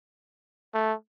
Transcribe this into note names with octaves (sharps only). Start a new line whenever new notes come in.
A3